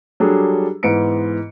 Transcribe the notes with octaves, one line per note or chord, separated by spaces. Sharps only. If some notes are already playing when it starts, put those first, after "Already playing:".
F#3 G3 D4 G#4 A4
G#2 E3 B3 C#7 D7